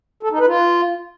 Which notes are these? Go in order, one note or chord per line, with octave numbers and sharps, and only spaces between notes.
A4
D#4
B4
F4